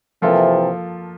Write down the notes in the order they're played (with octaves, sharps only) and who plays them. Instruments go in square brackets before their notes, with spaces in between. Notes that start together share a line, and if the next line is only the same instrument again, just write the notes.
[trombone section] C3 E3 [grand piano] F3 A#3 F4 A4